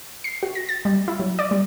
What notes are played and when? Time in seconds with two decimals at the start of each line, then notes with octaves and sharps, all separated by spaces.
0.24 C7
0.43 F#4
0.55 A#6
0.69 A6
0.85 G3
1.08 E4
1.20 F#3
1.39 D5
1.51 G3